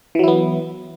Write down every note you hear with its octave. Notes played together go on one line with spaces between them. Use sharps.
E3 F#3 B3 E4